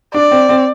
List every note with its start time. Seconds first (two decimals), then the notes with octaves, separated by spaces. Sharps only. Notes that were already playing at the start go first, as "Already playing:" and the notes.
0.14 D4 D5
0.31 C4
0.49 C4